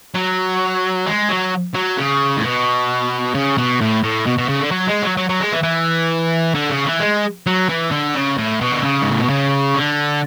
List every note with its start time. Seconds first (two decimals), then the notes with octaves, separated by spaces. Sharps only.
0.15 F#3
1.06 G#3
1.29 F#3
1.75 F#3
1.98 C#3
2.37 A2
2.43 B2
3.34 C#3
3.58 B2
3.81 A2
4.03 A2
4.26 B2
4.38 B2
4.49 C#3
4.60 D3
4.72 F#3
4.87 G#3
5.02 F#3
5.17 F#3
5.29 F#3
5.40 G#3
5.52 E3
5.63 E3
6.55 D3
6.70 C#3
6.85 E3
7.00 G#3
7.47 F#3
7.69 E3
7.92 D3
8.15 C#3
8.38 A2
8.61 B2
8.72 D3
8.83 C#3
9.02 G#2
9.11 A2
9.20 B2
9.29 C#3
9.75 D3